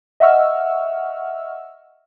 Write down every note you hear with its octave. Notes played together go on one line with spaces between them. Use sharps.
D#5 E5 F#5 C#6 E6 F6